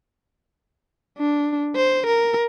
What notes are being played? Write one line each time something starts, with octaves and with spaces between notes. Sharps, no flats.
D4
C5
A#4